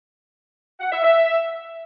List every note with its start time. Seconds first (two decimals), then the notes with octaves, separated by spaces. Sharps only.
0.80 F#5
0.91 E5
1.02 E5